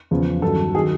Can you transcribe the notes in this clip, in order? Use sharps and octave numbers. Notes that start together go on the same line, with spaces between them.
E2 C#3 F3
G2 D#3 F#3 A4
D#3 F#3 G#4